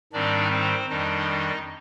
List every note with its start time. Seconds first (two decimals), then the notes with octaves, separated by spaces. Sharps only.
0.13 G#2 D#3 G3 C4 D4 D#4 D5
0.51 C4 C5
0.89 F2 D#3 G3 D4 D#4 D#5